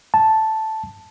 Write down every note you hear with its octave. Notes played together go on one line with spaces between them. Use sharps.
A5